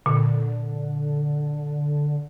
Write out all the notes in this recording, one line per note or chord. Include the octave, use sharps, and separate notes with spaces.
A#2 D3